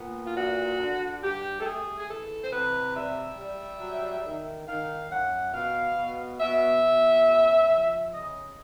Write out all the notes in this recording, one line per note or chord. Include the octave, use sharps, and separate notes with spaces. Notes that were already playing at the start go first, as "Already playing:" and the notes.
Already playing: A#2 B3
F4
G2 F#4
D3
G2 G4
A4
A3 G#4
G#4
E3 A4
C5
C3 B4
G3 E5
G3
F#3
D#3
D#3 F5
F#2 F#5
B2 F5
B2
B2 E5
B2
C#3
F3
C#3 D#5